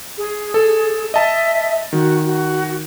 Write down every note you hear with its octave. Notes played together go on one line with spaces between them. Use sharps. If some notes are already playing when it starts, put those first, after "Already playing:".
G#4
A4
D#5 E5 A5
D#3 F#4
F#4